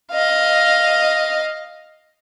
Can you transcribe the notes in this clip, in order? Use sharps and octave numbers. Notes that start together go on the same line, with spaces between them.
D#5 F5